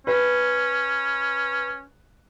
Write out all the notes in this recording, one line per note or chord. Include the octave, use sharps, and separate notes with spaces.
C#4 B4